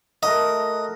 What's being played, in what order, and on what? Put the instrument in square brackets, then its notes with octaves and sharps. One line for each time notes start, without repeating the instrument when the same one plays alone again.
[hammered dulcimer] A3 F#4 A#4 [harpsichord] D#5